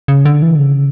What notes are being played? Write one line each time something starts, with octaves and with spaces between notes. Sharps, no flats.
C#3
D3
E3
D3
C#3